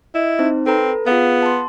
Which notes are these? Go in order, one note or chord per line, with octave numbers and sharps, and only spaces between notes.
E4 D#5
C4 D#4 C5
C4 A4 B4 A#5
B3 F4 G#4 F5
A5 C6